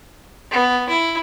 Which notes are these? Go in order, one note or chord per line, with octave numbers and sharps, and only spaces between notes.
B3
E4